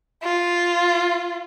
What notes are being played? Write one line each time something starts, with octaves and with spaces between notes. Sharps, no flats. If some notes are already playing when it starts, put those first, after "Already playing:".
F4